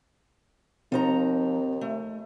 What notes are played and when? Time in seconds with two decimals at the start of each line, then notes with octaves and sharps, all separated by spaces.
0.92 D#2 F3 C4 D#4 A#5
1.81 A3